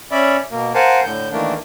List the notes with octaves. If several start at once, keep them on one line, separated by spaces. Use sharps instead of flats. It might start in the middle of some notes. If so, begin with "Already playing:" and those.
C#4 D5 E5 B5
B2 A#3
A#4 C5 F5 F#5 G#5 A5
A2 D3 G6
D#3 E3 A3 A#3 D4